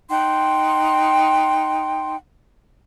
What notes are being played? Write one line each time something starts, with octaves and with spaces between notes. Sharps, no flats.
D#4 F#5 G5 C6